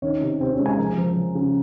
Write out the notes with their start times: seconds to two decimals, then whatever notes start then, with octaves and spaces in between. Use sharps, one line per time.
0.02 D#3 C#4 C#5
0.21 C3
0.40 C3 C4 C5
0.53 C#4 C#5
0.59 G#3
0.66 G#4 G#5
0.78 F3 A#4 A#5
0.98 F3
1.16 F3
1.35 C#3